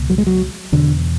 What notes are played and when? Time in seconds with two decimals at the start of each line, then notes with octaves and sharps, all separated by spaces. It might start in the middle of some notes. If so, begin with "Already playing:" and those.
Already playing: C#2 B2
0.10 F#3
0.18 G#3
0.27 F#3
0.72 E2 B2 D3